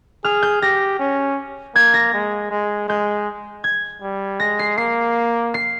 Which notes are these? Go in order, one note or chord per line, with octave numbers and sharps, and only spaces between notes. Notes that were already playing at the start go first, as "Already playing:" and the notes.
G#4 F6
G6
G4 A#6
C#4
A#3 G#6
A#6
G#3
G#3
G#3 G6
G#6
G3
G#3 A#6
C7
A#3 C7
C7